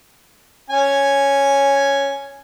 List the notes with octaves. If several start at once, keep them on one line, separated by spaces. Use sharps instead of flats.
C#4 G#5